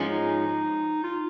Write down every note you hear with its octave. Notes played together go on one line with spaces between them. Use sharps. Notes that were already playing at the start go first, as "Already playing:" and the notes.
Already playing: G#2 F3 G#3 C#4
D#4
F4